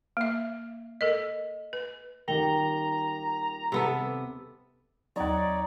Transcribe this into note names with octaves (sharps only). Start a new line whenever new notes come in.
A#3 E5
A4 A#4 D#5
B4
D#1 D#3 G4 A#4 G5 A#5 G7
C3 B3 A4
D#2 F#3 D#4 C#5 D5